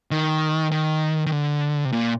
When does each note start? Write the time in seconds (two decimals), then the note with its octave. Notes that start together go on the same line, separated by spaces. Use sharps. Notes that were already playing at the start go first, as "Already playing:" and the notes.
0.11 D#3
0.71 D#3
1.26 D#3
1.32 D3
1.85 C3
1.93 A#2